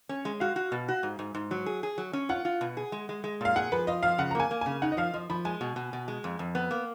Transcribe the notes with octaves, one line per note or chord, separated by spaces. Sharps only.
C#4
G#3
F#4 F5
F#4
B2
F#4
G#2
G#2
G#2
F#3
G#4
G#4
F#3
C#4
F4 F#5
F4
B2
G#4
G#3
G#3
G#3
A#2 F5
G#4 F#5
F3 B4
F4 D#5
F3 F5
C#3 F#5
A#5
A#3 G#5
A#3
C#3 G#5
D#4 F#5
D#5
F3 F5
F3 D#5
F3 B5
G#3 G#5
B2
B2
B2
G#3
F2
F2
B3
A#3